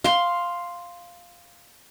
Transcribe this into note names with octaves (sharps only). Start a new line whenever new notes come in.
F5 C6